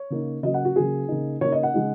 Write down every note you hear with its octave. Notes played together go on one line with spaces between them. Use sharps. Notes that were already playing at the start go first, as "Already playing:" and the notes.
Already playing: C#5
C#3 A#3 D#4
C#3 F#3 A#3 D#5
F#5
F#4
C#3 F#3 A#3 G#4
C#3 A#3 D#4
C#3 A#3 D#4 C#5
D#5
F#5
C#3 G#3 D#4